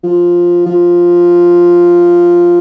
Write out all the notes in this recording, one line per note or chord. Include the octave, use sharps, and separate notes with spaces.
F3
F3